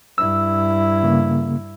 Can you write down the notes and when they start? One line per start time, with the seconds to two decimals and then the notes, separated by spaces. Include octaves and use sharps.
0.18 G2 E4 E6
1.03 C#3 A#3